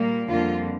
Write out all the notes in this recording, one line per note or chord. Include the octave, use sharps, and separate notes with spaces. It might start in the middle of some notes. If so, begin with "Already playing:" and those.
Already playing: A#2 G3 A#3
F2 D3 G3 A#3 F4